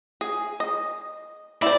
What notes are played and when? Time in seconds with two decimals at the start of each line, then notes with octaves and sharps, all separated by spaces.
0.21 G#4
0.60 D#5
1.62 E4 C5 D5